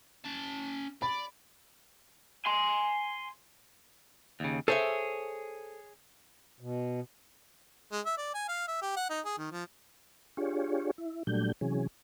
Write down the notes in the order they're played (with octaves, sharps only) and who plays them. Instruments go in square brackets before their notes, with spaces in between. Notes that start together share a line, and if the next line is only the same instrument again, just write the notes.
[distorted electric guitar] C#4 A5
[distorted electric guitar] D5 [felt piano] B5
[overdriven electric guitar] G#5 C6
[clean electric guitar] D#2 C#3
[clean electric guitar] G#4 C#5 [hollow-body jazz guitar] A4 C5 E5
[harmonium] B2
[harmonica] G#3
E5
D5
G#5
F5
E5
G4
F#5
D#4
G#4
D#3
F3
[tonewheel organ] D4 F4 G4 G#4 C#5
E4
A#2 F#3 G3 A3 D4 G6
C3 E3 F#3 C#4 G#4